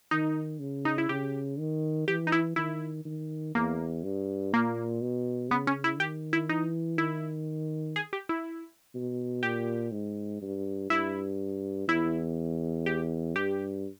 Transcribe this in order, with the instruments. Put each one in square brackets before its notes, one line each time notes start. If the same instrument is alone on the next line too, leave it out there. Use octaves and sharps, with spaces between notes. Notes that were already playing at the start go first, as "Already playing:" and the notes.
[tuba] D#3 [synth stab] D#4
[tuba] C#3
[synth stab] D#4
E4
[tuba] C#3 [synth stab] G4
[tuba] D#3
[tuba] E3 [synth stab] G4
[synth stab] D#4
E4
[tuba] D#3 [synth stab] E4
[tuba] D#3
[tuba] E2 [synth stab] A#3
[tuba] G2
[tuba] A#2 [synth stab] A#3
[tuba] B2
[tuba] C#3 [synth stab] B3
[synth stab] C#4
E4
[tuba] D#3 [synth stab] G4
[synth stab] E4
[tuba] E3 [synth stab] D#4
[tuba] D#3 [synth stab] E4
[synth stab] G#4
G4
E4
[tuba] B2
[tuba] A#2 [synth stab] G4
[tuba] G#2
G2
[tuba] G2 [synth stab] E4
[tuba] E2 [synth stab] E4
[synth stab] G4
[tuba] G2 [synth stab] G4